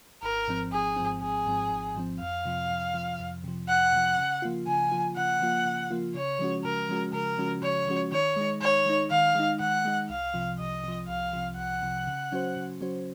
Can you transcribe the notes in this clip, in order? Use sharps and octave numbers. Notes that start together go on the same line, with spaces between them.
G#1 A#4
G#2 F3 C4
G#1 G#4
G#2 F3 C4
G#1 G#4
G#2 F3 C4
G#1
G#2 F3 C4
F2 F5
C3 F3
F2
C3 F3
F2
C3 F3
F2 F#5
C3 F3
C#3
F3 A#3 F4
C#3 G#5
F3 A#3 F4
C#3 F#5
F3 A#3 F4
C#3
F3 A#3 F4
C#3 C#5
F3 G#3 C#4 F#4
C#3 A#4
F3 G#3 C#4 F#4
C#3 A#4
F3 G#3 C#4 F#4
C#3 C#5
F3 G#3 C#4 F#4
D#3 C#5
G#3 D#4
D#3 C#5
G#3 D#4
D#3 F5
G#3 D#4
D#3 F#5
G#3 D#4
C2 F5
C3 F3
C2 D#5
C3 F3
C2 F5
C3 F3
C2 F#5
C3 F3
C#3
F#3 C#4 F#4 C5
C#3
F#3 C#4 F#4 C5